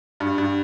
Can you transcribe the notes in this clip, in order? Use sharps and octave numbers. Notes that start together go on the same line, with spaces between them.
G2
G2